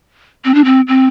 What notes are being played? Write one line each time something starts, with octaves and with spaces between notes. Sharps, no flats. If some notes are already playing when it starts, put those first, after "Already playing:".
C4
D4
C4
C4